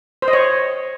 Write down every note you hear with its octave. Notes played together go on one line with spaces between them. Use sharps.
C5
D#5
C#5